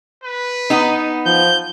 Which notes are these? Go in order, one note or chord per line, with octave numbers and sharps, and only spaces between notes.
B4
B3 D#4
F3 G6